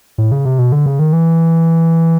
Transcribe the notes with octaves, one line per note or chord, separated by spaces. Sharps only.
A2
C#3
C3
B2
D3
C#3
D#3
E3